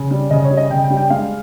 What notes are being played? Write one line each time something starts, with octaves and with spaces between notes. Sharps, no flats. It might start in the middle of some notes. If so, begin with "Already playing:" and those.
Already playing: C#3
G3
C#3 D#5
C#5
G3
D#5
C#3 G5
G5
G3
G5
G#3 F5